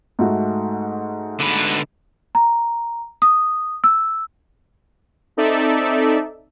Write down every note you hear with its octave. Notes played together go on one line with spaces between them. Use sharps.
G#2 A3 F#4
D3 B4
A#5
D#6
E6
C4 D#4 A4 D5 E5